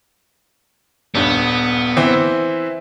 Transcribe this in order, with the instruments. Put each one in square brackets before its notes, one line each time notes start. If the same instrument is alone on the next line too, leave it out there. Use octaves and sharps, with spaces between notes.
[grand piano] D#1 G2 [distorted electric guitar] B3
[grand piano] E3 C4 E4